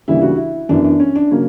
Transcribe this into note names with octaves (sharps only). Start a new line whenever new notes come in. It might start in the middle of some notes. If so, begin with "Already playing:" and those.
D2 C#3 E3 G3 A#3 E4
F#4
E4
F#2 E3 B3 D4
D4
C#4
D4
C#3 F#3 A#3 C#4